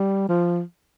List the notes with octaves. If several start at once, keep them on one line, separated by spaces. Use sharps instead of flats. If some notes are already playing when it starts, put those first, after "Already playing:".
Already playing: G3
F3